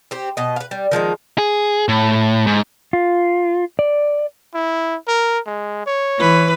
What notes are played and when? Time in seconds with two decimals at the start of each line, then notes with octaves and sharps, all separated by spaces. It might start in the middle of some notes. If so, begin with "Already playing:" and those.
0.11 C4 G4
0.37 B2 D#5
0.56 B4 F5
0.71 G3
0.91 D#3 F3 G#3 D#4
1.38 G#4
1.88 A2
2.47 G#2
2.93 F4
3.79 D5
4.54 E4
5.08 A#4
5.47 G#3
5.86 C#5
6.19 E3 B4